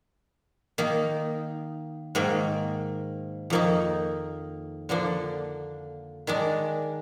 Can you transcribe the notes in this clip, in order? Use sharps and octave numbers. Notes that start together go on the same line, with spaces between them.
D#3 A#3 D#4
G#2 D#3 A#3
F2 D#3 A#3 D#4
D3 F3 A#3 D4
D#3 G#3 D4